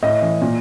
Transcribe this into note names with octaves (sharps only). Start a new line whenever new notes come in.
A2 D#5
E3
A#2